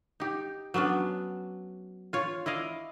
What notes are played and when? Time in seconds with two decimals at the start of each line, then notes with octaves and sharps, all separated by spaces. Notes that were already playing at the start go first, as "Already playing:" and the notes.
0.20 D#4 G4
0.74 F#3 B3 C#4 D4
2.13 F4 C#5
2.46 E4 D5 D#5 F5